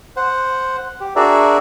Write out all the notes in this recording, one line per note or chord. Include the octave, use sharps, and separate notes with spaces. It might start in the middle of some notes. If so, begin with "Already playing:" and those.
C5 F#5
G4
D4 F#4 G#4 A#4 D5 E5